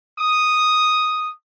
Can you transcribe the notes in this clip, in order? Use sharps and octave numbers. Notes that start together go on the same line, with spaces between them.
D#6